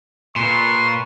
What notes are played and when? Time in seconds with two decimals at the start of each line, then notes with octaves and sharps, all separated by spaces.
0.36 A#2 B4 C6 C#6